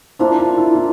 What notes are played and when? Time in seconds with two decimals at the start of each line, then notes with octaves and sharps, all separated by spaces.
0.19 F3 A#3 D4 E4 F4
0.39 E4
0.57 E4
0.75 E4